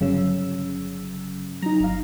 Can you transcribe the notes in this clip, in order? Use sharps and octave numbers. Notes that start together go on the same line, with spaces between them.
G1 C#3 F#3 E6
F#3 D#4 A#5
G1 F5